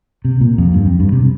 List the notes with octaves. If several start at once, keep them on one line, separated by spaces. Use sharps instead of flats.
C3
A#2
F2
G2
F2
G2
C3